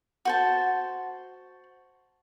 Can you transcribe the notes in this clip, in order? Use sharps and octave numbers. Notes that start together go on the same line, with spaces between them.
F#4 C5 A5